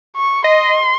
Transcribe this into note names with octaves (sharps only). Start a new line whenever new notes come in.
C#6
D#5 C6